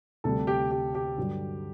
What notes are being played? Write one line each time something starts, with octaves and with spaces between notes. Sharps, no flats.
D2 C3 G3 A4
G4
G4
G4
G2 D3 F#3